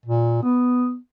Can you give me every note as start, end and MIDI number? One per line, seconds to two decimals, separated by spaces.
0.05 0.42 46
0.43 0.96 59